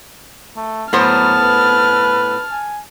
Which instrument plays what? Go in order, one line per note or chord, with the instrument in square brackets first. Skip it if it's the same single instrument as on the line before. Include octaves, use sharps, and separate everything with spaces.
[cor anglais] A3
[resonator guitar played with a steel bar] A2 B3 C5 [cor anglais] F#3 [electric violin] A5 F6
[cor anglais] B4
G#5